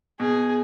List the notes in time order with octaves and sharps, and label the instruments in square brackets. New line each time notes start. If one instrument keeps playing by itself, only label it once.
[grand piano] B2 [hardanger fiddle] G#4